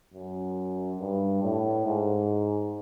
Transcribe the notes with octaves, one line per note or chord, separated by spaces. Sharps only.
F#2
G2
A2
G#2